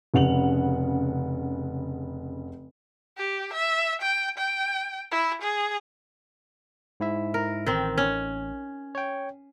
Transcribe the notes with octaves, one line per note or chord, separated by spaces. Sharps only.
F1 C#3 F#5 F7 F#7
G4
E5
G5
G5
E4
G#4
G#2 E4 E5
A#4
A1 D#3 C4
C#4
C#5 G5